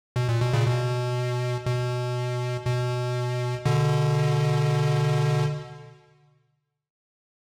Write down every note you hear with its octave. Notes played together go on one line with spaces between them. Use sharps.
B2
A#2
B2
A#2 C#3
B2
B2
B2
B2 D3